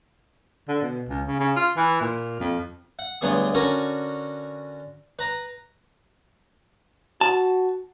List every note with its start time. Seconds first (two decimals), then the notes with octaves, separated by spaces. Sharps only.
0.68 D3
0.82 B2
1.09 C#2
1.26 C#3
1.40 C#3
1.56 F4
1.77 E3
2.01 A#2
2.40 F2
2.99 F#5
3.21 D2 G2 F#3 B3 G#4 D#6
3.54 D3 C#4 F#4 A#4 C#6
5.19 B4 A#5
7.21 F#4 A5